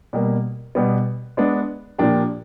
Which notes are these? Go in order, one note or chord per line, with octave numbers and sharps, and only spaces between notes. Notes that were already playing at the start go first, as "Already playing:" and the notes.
B2 G3 A#3
B2 G3 B3
G#3 B3 D4
A#2 F3 A#3 D4 G4